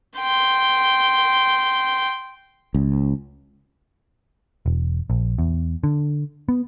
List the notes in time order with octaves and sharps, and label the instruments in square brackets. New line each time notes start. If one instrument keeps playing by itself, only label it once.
[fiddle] G5 C6
[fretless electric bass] C#2
[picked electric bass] E1
A#1
E2
D3
B3